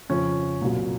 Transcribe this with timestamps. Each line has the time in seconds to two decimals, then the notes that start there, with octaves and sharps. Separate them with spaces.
0.09 F2 C#3 F3 C#4
0.61 C2 A#2 F#3